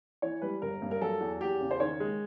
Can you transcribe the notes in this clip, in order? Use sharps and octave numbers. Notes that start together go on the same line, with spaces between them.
E3 C#5
G3 B4
G1 A#4
G2
A#4
F#3 A4
E2
E2 G4
C#3
C5
D#3 C#5
G#3